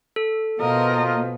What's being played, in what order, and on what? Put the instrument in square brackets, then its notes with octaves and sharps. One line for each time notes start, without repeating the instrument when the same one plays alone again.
[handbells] A4
[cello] B2 B3 [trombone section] F3 F4 [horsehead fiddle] A#4 D#5